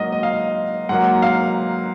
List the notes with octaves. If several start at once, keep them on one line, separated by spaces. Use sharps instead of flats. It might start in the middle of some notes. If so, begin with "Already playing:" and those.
Already playing: G#2 F#3 A#3 D#5 F#5
D#5
F5
G#2 F#3 A#3 F#5
F5